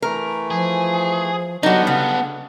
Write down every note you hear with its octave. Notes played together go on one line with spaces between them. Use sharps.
E3 A3 A#4
F3 G#4
D3 F#3 G3 B3 D4 D#4 F#4
C#3 F#5